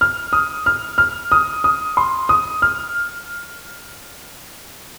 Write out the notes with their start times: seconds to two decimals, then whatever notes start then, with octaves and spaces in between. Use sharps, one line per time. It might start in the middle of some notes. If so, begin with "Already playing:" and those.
0.01 F6
0.33 D#6
0.66 F6
0.98 F6
1.32 D#6
1.64 D#6
1.97 C6
2.29 D#6
2.62 F6